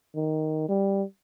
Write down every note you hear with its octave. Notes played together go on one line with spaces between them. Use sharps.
D#3
G3